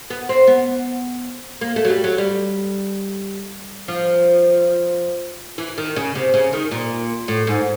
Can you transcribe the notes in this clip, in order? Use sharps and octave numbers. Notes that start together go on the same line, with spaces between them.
B3
C4
B3
A#3
A3
F#3
G3
F#3
G3
F3
E3
D#3
C#3
C3
C#3
D#3
A#2
A2
G#2